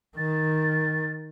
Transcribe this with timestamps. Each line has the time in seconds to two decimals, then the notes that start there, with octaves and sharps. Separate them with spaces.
0.17 D#3 A6